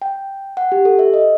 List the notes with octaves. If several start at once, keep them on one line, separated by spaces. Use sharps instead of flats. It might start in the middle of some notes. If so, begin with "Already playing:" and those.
G5
F#5
G4
A4
E5
D#5